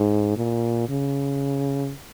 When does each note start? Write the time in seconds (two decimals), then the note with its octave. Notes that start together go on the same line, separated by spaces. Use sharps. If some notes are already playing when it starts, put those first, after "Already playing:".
Already playing: G#2
0.36 A#2
0.89 C#3